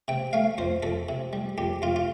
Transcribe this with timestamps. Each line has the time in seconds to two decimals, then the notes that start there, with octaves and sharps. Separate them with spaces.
0.08 C3 G5
0.33 A3 F5
0.58 F2 C5
0.83 F2 A4
1.09 C3
1.33 G3
1.58 F2 G4
1.82 F2 F4
1.96 F4